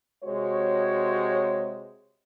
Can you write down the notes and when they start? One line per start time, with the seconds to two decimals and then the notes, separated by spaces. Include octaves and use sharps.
0.23 C3 G#3 F#4 C5 C#5